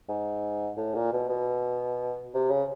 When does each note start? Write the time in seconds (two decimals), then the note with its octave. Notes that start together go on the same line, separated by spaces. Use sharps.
0.08 G#2
0.77 A2
0.95 A#2
1.13 B2
1.29 B2
2.34 C3
2.50 C#3